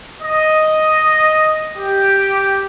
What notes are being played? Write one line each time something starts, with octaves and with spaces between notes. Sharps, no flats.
D#5
G4